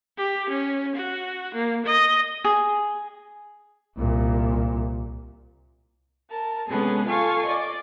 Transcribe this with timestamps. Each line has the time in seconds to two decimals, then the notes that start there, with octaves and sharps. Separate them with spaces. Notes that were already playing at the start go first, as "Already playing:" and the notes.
0.17 G4
0.49 C#4
0.95 F#4
1.54 A#3
1.85 D#5
2.44 G#4
3.97 C2 A#2
6.30 A#4 A5
6.69 C3 G#3 B3 C#4 G#4 A4
7.07 F4 A4 F5 G#5 C#6
7.46 D5 D#5